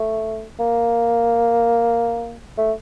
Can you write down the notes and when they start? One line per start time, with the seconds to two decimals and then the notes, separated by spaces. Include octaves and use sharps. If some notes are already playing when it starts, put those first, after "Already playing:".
Already playing: A3
0.59 A#3
2.58 A3